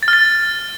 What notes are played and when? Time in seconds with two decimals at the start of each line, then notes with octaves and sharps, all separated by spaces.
0.03 A6
0.08 F6
0.13 A6